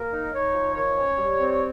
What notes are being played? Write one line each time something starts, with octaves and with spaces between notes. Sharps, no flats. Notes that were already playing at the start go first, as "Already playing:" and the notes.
Already playing: A#3 A#4
D#4
D#5
D#4 C#5
F3
D#3 C#5
C#4
G3
C4
C#5